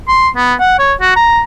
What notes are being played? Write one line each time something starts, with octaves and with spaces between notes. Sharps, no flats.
C6
B3
F#5
C#5
F#4
A#5